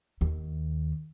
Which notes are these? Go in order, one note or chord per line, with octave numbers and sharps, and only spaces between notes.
D#2